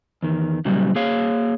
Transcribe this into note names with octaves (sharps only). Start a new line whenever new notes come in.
E2 D#3
A#2 C#3 F#3 G3
A#3 G#4 C#5 F5